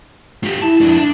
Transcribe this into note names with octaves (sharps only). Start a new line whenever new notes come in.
F4 G4
E4 A5
F2 D4
D4